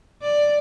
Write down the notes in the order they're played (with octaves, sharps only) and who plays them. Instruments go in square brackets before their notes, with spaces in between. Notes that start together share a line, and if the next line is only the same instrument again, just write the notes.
[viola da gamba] D5